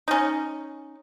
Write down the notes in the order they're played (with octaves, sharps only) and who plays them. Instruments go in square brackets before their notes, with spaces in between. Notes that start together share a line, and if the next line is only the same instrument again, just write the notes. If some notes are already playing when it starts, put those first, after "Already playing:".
[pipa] C#4 D#4